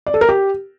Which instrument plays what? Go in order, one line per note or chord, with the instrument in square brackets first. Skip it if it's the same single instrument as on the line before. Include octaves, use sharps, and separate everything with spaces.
[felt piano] D5
A4
A#4
G4